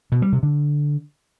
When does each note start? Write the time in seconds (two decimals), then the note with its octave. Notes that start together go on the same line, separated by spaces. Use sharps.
0.12 B2
0.22 G3
0.32 C3
0.43 D3